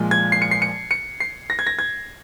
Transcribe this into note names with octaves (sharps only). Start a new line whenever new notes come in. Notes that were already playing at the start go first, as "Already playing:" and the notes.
Already playing: A#2 F3 G#3
G#6
C7
C#7
C7
C#7
C#7
C7
A#6
G#6
A#6
G#6